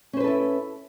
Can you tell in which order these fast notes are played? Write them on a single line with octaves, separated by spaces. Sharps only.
C#4 C5 B4 A4 E4